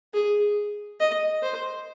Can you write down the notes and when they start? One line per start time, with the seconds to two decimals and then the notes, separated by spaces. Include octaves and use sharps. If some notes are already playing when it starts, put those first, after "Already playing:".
0.14 G#4
1.00 D#5
1.43 C5